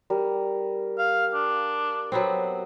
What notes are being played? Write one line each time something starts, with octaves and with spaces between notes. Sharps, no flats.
G3 A#4
F5
D4
F#3 B3 C4